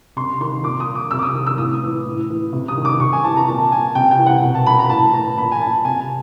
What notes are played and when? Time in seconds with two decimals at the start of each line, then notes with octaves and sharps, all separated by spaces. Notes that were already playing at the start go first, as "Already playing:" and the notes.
0.16 C3 C6
0.41 D#3 C6
0.64 A#2 D6
0.80 D#6
0.95 D6
1.11 C3 E6
1.19 D6
1.23 D#6
1.34 D#3
1.46 E6
1.58 A2 D#6
1.83 E3
2.06 A2
2.30 E3
2.53 C3
2.68 D#6
2.77 D#3
2.85 D6
3.00 C3 C#6
3.13 G#5
3.24 E3 A5
3.37 A#5
3.48 A#2 A5
3.72 G#5
3.95 C3 G5
4.11 G5
4.19 E3
4.26 F#5
4.43 B2
4.55 A5
4.66 B5
4.78 A#5
4.89 A2 A5
5.13 E3 A#5
5.37 A#2 B5
5.52 G#5
5.61 A5
5.85 C3 G#5